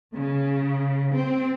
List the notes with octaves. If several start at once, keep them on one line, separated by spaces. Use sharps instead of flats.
C#3
C4